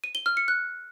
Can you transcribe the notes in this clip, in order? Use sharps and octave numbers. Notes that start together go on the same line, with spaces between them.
D#7
G7
F6
C#7
F#6